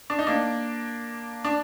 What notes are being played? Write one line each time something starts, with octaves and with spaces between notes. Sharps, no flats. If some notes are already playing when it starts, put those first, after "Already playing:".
D4
D#4
A#3 D4
D4